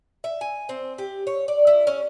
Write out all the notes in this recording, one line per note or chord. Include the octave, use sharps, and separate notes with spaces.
E5
G#5
C4
G4
C#5
D5
E4
C#4